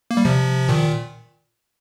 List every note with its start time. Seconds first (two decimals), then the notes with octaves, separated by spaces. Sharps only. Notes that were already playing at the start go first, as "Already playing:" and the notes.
0.11 A#3
0.17 G3
0.25 C3 F3
0.69 A#2 D#3